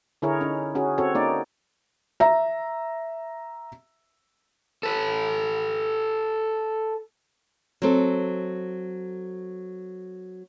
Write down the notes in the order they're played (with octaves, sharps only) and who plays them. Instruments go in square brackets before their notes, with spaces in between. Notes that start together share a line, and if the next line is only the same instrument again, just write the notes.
[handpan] D3 E4 G#4 A#4 C#5
C#4 D#4
C#4 F#4 G#4
C4 F#4 A4 C#5
A#3 C#4 D#4 D5
[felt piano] E5 A#5
[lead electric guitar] A4 B4
[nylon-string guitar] F#3 C4 A4